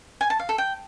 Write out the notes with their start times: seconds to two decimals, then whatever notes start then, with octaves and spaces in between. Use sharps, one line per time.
0.21 G#5
0.30 A5
0.39 F5
0.49 A4
0.58 G5